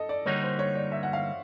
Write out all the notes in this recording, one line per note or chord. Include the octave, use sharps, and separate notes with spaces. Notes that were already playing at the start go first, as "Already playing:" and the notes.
Already playing: A4 D#5
D5
D3 G3 A#3 D#4 F#4 C#5
C5
C#5
D5
E5
F#5
F5